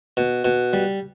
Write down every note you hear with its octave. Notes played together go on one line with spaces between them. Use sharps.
B2
B2
G3